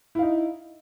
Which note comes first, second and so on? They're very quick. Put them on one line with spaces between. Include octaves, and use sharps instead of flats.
E4 F5 D#4